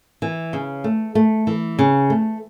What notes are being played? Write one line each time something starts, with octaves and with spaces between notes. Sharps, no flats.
E3
C#3
A3
A3
E3
C#3
A3